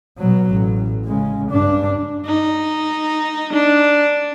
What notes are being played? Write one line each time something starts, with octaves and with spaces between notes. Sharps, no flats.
B2 F#3
A1
C#3 G#3
G2 D4
D#4
D4